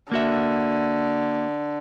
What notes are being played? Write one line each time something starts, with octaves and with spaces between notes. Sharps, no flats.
D3 A#3 F#4 E5